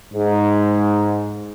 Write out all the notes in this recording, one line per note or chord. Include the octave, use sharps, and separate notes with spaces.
G#2